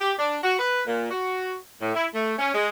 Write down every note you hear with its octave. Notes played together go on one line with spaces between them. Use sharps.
G4
D4
F#4
B4
A#2
F#4
A2
E4
A3
C#4
G#3